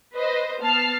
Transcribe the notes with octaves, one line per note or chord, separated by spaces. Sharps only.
B4 C5 D#5
B3 A5 F6 C7